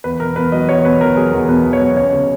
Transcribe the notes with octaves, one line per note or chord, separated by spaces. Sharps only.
E2 B4
B2 A#4
E2 B4
F#3 D#5
E2 C#5
B2 B4
E2 A#4
F#3 G#4
E2 A#4
B2 B4
E2
C#5
F#3
C#2 C#5
C#3